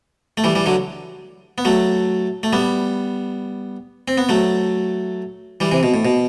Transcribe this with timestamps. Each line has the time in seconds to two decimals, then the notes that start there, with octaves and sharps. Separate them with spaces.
0.37 A3
0.44 E3 G3
0.55 E3 G3
0.66 D3 F#3
1.58 B3
1.65 F#3 A3
2.43 A3
2.53 G3 B3
4.08 C4
4.18 B3
4.29 F#3 A3
5.60 E3 G3
5.71 C3 E3
5.83 B2
5.94 A2
6.05 B2